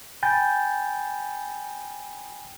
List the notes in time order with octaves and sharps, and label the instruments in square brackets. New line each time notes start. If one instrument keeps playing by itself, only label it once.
[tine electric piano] G5 G#5 B5 G6 A6